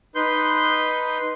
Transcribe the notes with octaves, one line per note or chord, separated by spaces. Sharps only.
D#4 B4 C6 G6